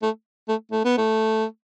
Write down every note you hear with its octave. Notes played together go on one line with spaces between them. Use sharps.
A3
A3
A3
B3
A3